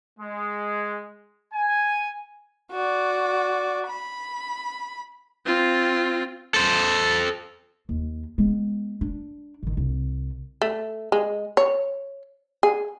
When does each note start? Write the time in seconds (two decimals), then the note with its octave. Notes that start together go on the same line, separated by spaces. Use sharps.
0.20 G#3
1.54 G#5
2.71 F#4 D5
3.87 B5
5.45 C4 F4
6.54 A4 C5
7.89 D#2
8.38 G#3 B3
9.01 D4
9.63 A1 D#3
9.77 C2
10.62 A3
11.12 G#3
11.57 C#5
12.63 G#4